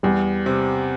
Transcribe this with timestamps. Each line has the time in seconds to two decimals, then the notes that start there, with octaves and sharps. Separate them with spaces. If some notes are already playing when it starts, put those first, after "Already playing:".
0.03 E2 G3
0.46 C3